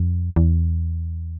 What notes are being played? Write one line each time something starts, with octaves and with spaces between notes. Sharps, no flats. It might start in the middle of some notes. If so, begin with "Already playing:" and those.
Already playing: F2
E2